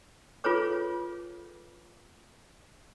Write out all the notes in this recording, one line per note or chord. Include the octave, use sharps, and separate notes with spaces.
F4 G#4 A4 B4 C#5 D6